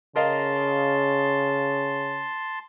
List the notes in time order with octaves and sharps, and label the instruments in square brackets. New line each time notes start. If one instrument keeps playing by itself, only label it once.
[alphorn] C#3 [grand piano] A#4 D#5 F5 [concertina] A5 C6